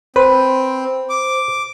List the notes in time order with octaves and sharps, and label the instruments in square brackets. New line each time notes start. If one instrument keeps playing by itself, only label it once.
[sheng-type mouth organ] C4 [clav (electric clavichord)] B4 [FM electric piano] C5
[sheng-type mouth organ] D6